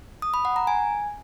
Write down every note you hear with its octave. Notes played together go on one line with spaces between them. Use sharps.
D#6
B5
F#5
A#5
G#5